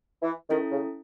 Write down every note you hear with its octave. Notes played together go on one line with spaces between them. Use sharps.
E3
D#3 C#4 E4 A4
C#3